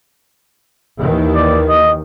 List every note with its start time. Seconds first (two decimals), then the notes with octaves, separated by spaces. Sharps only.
1.00 D#2 D#3 E3
1.35 D5
1.69 D#5